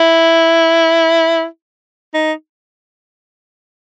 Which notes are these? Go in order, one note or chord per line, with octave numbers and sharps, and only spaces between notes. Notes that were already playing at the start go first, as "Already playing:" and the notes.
Already playing: E4
D#4